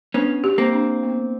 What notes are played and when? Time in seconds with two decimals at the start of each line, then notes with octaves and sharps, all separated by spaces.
0.14 B3 C#4 D4
0.44 G4
0.58 A#3 C4
0.73 D4
1.03 B3